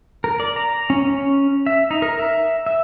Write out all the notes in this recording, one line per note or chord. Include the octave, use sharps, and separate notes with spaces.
A#4
D5
A#5
C#4
C#4
E5
D#4
A#4
E5
E5